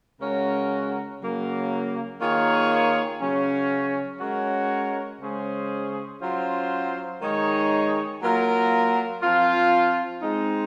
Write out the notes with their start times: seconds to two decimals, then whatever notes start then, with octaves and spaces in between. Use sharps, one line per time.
0.20 C#3 G#3 C#4 F#4 A#4
1.21 C#3 F#3 A#3
2.20 D#3 A#3 F4 G#4 C#5
3.21 C#3 F#3 C#4
4.21 G#3 C#4 F#4 A#4 C#5
5.21 C#3 G#3 C#4 G#4 C5
6.21 F#3 C#4 F4 C5
7.21 D#3 G#3 D#4 G#4 C#5
8.21 F#3 A#3 F4 A#4
9.22 F3 C4 F4
10.22 G#3 C4 D#4